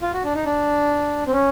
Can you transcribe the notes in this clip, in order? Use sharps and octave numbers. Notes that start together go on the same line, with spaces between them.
F4
F#4
D4
D#4
D4
C4
C#4